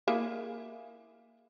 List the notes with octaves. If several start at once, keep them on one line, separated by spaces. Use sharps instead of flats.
A#3 E4 G#4